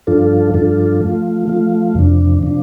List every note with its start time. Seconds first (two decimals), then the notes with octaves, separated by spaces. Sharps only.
0.07 G2 F3 D4 F4 A4
0.54 G2 F3 D4 F4 A4
1.01 F3 A3 F4
1.48 F3 A3 F4
1.95 F2 C3 F3 D4
2.42 C3 F3 D4